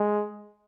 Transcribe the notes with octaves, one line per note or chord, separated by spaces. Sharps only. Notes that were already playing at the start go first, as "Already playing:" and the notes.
Already playing: G#3